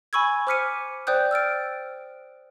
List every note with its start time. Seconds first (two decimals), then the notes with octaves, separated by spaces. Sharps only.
0.13 G#5 B5 C#6 E6 G#6
0.47 C5 D6 F6 B6 C#7 D#7
1.07 C5 D5 G5 D#6 F#6 G6
1.31 E6 F6 A6 D7